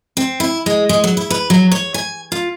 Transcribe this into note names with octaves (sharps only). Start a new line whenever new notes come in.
C4
E4
G#3
G#3
F#3
E4
B4
F#3
C#5
G#5
F4